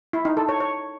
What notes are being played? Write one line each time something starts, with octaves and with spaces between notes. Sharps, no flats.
E4
D#4
A4
C#5
C#5